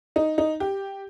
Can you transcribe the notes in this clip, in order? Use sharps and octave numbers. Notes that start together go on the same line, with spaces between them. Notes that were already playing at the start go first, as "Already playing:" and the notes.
D#4
D#4
G4